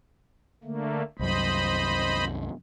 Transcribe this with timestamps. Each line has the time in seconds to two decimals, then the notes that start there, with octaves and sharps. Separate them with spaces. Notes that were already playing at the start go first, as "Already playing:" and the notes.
0.64 D3 A3 A#3
1.19 C2 F#2 C5 D#5 B5